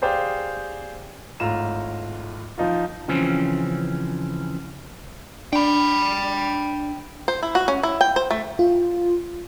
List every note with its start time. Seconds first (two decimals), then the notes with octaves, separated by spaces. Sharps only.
0.02 G4 G#4 C5 D5 F5 G5
1.40 G#1 A2 F4 A#5 E7
2.58 F3 D#4 F4
3.08 C#3 E3 F3 C4 C#4
5.53 D4 G5 B5
7.28 C5
7.43 E4
7.55 F#4
7.68 C#4
7.83 E4
8.01 G5
8.16 C5
8.31 A3
8.59 F4